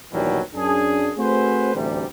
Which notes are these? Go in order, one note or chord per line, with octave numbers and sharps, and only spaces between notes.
A#1 D#2 B2 E3 F#3 G3
F#2 D4 G#4
A3 C4 F#4 G#4 B4 C5
A1 D2 C3 E3 G3